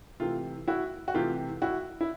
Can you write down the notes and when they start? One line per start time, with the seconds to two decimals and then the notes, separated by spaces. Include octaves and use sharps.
0.20 C3 E3 A3 F4
0.68 E4 F#4
1.08 F#4
1.14 C3 E3 A3 F4 G4
1.62 E4 F#4
2.01 E4